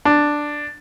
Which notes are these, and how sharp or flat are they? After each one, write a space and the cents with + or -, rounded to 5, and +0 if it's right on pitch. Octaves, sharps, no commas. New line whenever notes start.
D4 +5